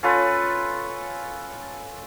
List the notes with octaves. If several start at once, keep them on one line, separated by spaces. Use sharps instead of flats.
C#4 F4 A4 B4